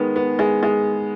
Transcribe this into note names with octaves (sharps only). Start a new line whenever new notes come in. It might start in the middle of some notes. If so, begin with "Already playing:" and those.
Already playing: D#3 G#3 B3
B3
G#3
G#3